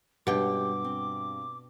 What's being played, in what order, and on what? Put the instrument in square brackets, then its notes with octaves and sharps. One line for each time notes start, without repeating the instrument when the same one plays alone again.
[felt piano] G2 [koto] B2 G5 [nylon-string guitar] G#3 C#4 G4 [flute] D6
[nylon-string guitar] C4